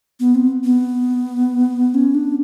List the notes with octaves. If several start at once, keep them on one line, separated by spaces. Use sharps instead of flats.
B3
C4
B3
C#4
D4